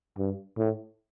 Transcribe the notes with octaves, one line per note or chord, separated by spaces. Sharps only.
G2
A2